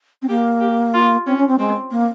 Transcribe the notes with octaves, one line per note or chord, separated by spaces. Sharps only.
C4
A#3 G4
G4
F4
C4 C#4
C#4
C4
G#3 C4
A#3